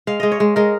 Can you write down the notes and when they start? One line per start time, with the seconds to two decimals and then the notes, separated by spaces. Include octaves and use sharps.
0.07 G#3 F5
0.20 G#3 D#5
0.32 C#5
0.40 G#3
0.56 G#3 A#4